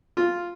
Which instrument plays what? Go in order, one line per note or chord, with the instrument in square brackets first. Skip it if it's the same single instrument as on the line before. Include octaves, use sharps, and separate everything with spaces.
[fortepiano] F4